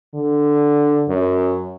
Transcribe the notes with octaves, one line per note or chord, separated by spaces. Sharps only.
D3
F#2